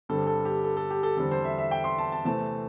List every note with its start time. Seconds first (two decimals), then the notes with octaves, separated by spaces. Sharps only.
0.09 G2 D3 G3 C4 A4
0.27 A4
0.45 G4
0.64 A4
0.77 A4
0.91 G4
1.03 A4
1.17 E2 D3 G3 C4 A4
1.31 C5
1.45 E5
1.58 E5
1.71 G5
1.84 C6
1.98 A5
2.12 A5
2.25 C3 E3 A3 C4 A5